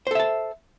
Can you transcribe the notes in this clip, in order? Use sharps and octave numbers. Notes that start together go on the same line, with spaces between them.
A4 C5 E5 A5